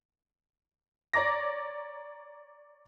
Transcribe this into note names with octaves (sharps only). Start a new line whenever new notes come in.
C#5 D5 A#5 D6 A#6